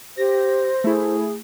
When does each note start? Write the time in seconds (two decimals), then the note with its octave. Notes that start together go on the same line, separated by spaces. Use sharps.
0.17 G4 C5 A#6
0.84 A3 E4 G#4